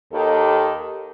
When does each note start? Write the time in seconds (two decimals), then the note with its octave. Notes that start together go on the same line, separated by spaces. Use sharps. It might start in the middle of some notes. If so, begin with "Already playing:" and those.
0.13 D#2 D#3 G4 A4